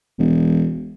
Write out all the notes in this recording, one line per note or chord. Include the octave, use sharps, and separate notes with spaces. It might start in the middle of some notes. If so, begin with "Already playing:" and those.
E1